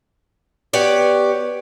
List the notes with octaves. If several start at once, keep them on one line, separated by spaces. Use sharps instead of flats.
B3 G4 C#5 D5